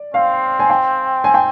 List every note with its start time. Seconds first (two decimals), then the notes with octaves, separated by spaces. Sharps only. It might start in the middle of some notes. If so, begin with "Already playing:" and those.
Already playing: D5
0.14 C4 F5
0.59 G#5
0.70 G5
1.24 G#5
1.34 G5